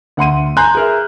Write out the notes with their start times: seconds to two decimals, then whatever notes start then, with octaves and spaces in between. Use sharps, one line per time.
0.17 D2 F#5 C6 D#7
0.57 G#5 A#5 C6 F#6 G6
0.75 G#4 A#4 E5